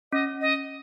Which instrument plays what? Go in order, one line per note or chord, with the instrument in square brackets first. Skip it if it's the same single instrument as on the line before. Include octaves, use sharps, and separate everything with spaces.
[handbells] C#4 [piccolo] D#5
[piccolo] D#5